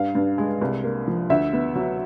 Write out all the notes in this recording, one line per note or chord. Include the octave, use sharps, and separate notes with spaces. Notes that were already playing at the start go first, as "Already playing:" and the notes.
Already playing: G2 F5
G2
G#3
C2
A#3
F3
D2 E5
B3
F#3